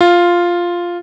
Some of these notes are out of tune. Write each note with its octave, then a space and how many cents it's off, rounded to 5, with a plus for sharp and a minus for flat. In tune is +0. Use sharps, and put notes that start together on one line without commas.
F4 +0